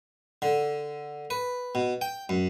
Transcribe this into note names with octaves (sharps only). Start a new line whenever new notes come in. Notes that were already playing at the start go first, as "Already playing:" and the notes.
D3
B4
B2
G5
F#2